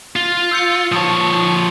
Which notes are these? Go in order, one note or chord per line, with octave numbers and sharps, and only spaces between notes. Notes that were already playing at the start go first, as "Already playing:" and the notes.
F4
E6 G6 C#7
F3 C#5 A5 D#6